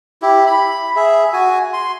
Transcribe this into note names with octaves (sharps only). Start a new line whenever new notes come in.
E4 G4
B5
G#4 E5
F#4 G#5
C6